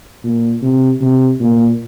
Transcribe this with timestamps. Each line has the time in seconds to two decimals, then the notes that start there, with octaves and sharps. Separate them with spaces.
0.24 A#2
0.62 C3
1.01 C3
1.40 A#2